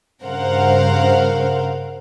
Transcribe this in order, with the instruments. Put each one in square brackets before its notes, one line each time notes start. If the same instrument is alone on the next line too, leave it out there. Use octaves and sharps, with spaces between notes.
[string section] G2 C#3 A#4 C5 F5 F#5